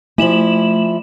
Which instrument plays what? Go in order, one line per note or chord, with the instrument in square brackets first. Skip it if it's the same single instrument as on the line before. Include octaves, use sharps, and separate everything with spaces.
[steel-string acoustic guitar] F3 E4 [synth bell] A3 E7 F#7